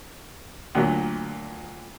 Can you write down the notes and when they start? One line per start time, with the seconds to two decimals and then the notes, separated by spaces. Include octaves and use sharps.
0.75 D2 A#2 F#3